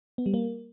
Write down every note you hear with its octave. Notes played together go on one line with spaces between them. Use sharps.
B3
G3
A#3